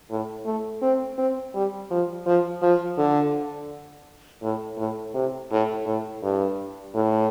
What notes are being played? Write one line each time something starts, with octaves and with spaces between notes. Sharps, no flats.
A2
A3
C4
C4
G3
F3
F3
F3
D3
A2
A2
C3
A2
A2
G2
A2